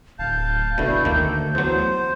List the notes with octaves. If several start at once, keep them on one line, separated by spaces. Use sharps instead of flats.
D1 F5 A5 G6
G1 B2 D3 A3 E4
D2 D#3 A#3 A4
E2 F#3 C5